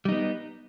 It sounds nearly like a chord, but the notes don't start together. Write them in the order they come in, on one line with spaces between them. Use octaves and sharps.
G3 D#4 B3